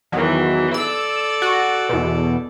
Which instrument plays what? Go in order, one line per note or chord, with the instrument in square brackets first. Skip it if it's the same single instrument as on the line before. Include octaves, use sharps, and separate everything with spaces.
[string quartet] E2 E3 [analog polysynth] D#3 F#3
[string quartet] A4 D5 [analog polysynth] E6
[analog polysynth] F#4
E2 B2